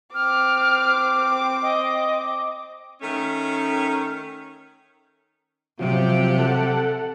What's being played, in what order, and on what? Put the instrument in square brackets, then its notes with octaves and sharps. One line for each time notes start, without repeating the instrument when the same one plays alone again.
[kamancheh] C4 D6 [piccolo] F6
[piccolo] D#5
[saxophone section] D#3 A3 C#4
[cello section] C3 G4 [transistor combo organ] F3 F#3
[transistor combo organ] A4 F#5